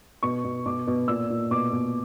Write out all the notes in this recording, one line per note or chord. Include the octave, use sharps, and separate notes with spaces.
B2 C#6
B2
B2 D6
B2
A#2 E6
A#2
B2 D6
B2